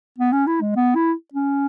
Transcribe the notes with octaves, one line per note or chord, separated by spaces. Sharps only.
B3
C#4
E4
G#3
B3
E4
C#4